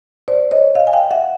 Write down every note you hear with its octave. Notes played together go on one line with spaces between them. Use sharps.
C5 D5
C#5 D#5
D#5 F5
G#5
F5 G5
E5 F#5